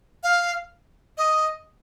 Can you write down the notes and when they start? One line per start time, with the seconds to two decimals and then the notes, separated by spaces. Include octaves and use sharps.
0.23 F5
1.18 D#5